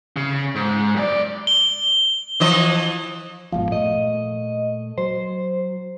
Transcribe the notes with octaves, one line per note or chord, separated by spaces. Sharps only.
C#3
G#2
F#2 D5
G7
E3 F3 D#5
G1 G#2 B2 F3
A#2 A3 D#5
F#3 C5